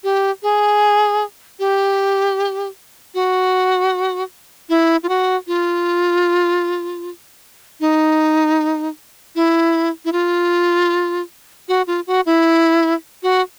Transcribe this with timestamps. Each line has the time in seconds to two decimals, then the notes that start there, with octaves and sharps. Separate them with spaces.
0.04 G4
0.43 G#4
1.59 G4
3.14 F#4
4.69 E4
5.03 F4
5.09 F#4
5.47 F4
7.80 D#4
9.35 E4
10.05 E4
10.12 F4
11.68 F#4
11.87 F4
12.07 F#4
12.26 E4
13.23 F#4